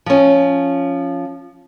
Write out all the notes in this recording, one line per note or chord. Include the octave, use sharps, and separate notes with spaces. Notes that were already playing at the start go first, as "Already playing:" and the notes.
F3 C#4